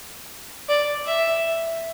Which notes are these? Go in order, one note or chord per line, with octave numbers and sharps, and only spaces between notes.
D5
E5